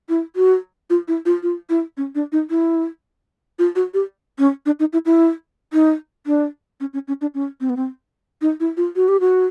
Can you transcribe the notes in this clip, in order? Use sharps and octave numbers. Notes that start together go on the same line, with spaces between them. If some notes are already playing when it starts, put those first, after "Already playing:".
E4
F#4
F4
E4
F4
F4
E4
C#4
D4
D#4
E4
F4
F#4
G4
C#4
D4
D#4
E4
E4
D#4
D4
C#4
C#4
C#4
D4
C#4
C4
B3
C4
D#4
E4
F4
F#4
G4
F#4